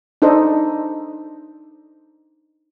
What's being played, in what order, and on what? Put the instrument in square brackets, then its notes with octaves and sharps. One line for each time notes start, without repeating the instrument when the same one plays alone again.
[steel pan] D4 D#4 A4 C5 D#5